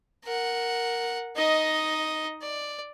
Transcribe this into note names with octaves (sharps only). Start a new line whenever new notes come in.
A#4 F#5
D#4 D#5
D5